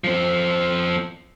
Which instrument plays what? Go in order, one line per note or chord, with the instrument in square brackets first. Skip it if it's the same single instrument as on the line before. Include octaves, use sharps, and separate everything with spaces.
[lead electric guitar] F3 C4